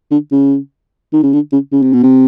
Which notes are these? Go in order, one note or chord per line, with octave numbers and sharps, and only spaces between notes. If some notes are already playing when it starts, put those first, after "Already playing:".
D3
C#3
D#3
C#3
D3
C#3
C#3
C3
B2
C3